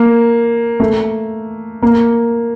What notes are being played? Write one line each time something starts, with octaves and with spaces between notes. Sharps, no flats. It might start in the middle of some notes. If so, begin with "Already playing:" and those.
Already playing: A#3
A3
A#3